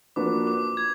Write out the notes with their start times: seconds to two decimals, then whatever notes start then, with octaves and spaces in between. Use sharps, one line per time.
0.16 F3 A#3 D4 F#4 B4 D6
0.47 D6
0.77 G#6